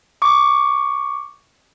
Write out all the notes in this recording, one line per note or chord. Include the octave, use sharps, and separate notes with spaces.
C#6 D6